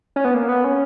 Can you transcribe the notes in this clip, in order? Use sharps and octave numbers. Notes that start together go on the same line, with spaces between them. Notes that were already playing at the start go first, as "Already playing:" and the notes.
C#4
B3
A#3
B3
C#4